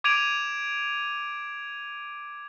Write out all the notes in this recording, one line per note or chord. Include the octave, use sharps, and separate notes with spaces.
D6 G#6 D7 D#7 F7